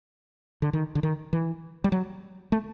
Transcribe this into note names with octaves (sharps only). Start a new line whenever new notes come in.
D3
D#3
D3
D#3
E3
G3
F#3
A3